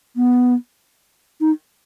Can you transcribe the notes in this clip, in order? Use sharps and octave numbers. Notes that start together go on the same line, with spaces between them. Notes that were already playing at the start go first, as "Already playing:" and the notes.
B3
D#4